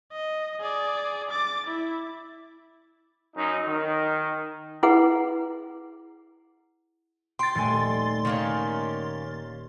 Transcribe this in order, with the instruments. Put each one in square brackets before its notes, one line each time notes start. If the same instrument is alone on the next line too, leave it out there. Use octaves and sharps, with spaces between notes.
[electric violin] D#5
G#4 D5
D6 A6
E4
[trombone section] F#2 D#4
D#3
[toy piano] E4 G#4 B4 F#5
[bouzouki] G5 [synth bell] C6 A6
[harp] D#1 A3 G#5
[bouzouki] D#3 A#3 C#4